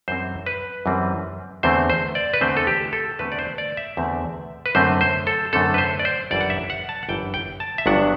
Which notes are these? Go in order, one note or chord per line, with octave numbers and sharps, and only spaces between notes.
F#2 E3 G3 C4 C5
B4
F#2 E3 G3 C4
E2 D3 A3 C4 C5
C5
D5
B4
E2 D3 A3 C4 C5
A4
G4
A4
E2 D3 A3 C4 B4
D5
C5
D5
E5
E2 D3 A3 C4
B4
F#2 D3 A3 C4 C5
C5
A4
F#2 D3 A3 C4 A4
B4
C5
D5
C5
G1 F#2 E3 G3 D5
F#5
E5
F#5
A5
F#5
G1 F#2 E3 G3 G5
G5
A5
E5
G1 G2 F#3 B3 D4 F#5